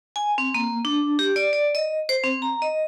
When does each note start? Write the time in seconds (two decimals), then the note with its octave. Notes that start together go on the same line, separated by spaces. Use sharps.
0.16 G#5
0.38 C4
0.54 A#3
0.85 D4
1.19 G4
1.36 D5
1.53 D5
1.75 D#5
2.09 C5
2.23 C4
2.42 A#5
2.62 D#5